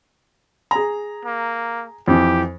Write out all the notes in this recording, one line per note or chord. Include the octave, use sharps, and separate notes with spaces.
G#4 A#5
A#3
F2 E3 G4